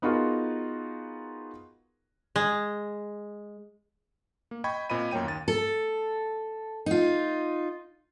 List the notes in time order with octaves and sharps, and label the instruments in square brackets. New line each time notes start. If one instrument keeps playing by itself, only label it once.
[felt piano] B3 D#4 F4 F#4 G#4 A#4
[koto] G#3
[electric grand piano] A#3
D#5 G5 B5 C#6 G#6
A#2 C4 D#5 B5 D#7
F#2 A#3 C#5 G5 D#7
D#2 A6
[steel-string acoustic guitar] A4
D#4 F4